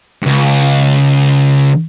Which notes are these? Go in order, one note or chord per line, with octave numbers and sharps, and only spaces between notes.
C#2 G2